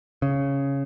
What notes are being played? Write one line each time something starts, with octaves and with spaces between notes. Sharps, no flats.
C#3